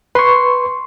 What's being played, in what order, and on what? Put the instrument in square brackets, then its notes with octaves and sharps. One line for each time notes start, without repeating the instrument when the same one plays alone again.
[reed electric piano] B4 C#6 [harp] C6